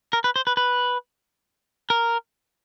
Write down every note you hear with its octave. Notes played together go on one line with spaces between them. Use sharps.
A#4
B4
C5
B4
B4
A#4